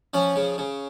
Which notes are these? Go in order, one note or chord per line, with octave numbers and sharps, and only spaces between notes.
F3 C#4
C#3
C#3